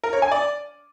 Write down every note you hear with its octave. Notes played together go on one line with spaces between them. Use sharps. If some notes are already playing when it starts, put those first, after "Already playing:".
A#4
C#5
G#5
D5